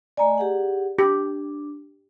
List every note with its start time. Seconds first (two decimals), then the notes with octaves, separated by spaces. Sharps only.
0.17 A3 D5 D#5 G#5 A#5
0.38 G4 G#4 F#5
0.99 D4 G4